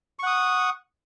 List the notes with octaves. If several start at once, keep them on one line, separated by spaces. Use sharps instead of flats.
F#5 C#6 D#6